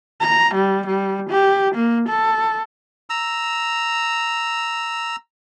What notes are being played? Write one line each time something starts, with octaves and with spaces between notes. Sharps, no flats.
A#5
G3
G3
G4
A#3
A4
A#5 E6